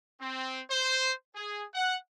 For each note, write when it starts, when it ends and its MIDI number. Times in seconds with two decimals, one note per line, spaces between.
0.21 0.61 60
0.70 1.13 72
1.36 1.65 68
1.75 1.97 78